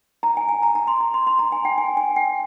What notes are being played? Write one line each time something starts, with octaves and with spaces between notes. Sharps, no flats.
A#5
G#5
G#5
A#5
A#5
C6
A#5
C6
C6
A#5
G#5
G5
G#5
G#5
G5